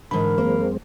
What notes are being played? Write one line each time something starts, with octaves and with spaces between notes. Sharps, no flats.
G#2 D3 E3 A#4 B5
F#2 G#3 A#3 C4